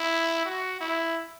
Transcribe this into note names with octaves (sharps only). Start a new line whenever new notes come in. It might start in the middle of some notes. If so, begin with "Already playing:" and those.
Already playing: E4
F#4
E4